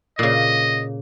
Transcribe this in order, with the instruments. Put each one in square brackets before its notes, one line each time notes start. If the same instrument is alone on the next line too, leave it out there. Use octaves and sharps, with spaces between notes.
[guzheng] A#2 C#3 [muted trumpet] D#5